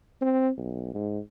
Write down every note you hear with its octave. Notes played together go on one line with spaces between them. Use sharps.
C4
B1
G#2